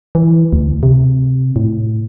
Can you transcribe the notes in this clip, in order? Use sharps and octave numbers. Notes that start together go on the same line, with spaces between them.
E3
D2
C3
A2